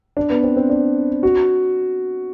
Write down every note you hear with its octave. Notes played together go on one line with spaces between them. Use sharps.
D4
B3
C4
C4
D4
F#4